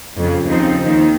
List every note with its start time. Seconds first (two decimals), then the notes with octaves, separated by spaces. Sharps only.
0.19 F2 C#3 F3
0.49 D#2 C#3 F3 C4 D#4
0.79 D#2 D#3